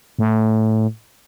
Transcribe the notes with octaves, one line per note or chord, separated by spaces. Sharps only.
A2